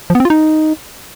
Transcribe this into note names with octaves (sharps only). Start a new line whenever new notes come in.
F3
B3
C4
F4
D#4